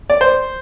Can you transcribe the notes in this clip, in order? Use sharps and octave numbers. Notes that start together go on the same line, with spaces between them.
D5
C5